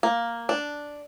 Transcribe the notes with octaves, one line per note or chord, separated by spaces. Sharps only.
A#3
D4